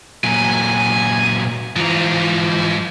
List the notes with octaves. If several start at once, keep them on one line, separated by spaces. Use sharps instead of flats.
A#2 F#3 G#5
G#2 E3 F3 A#5